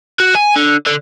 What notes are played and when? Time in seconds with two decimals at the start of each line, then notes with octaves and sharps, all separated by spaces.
0.20 F#4
0.35 G#5
0.56 D3
0.87 D3